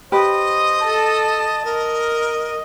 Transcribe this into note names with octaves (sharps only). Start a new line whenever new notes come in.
G4 B4 C5 D#5 B5
A4 A5
A#4 D#5